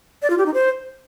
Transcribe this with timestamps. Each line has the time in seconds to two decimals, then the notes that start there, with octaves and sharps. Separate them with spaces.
0.22 D5
0.30 F4
0.38 G4
0.46 D#4
0.54 C5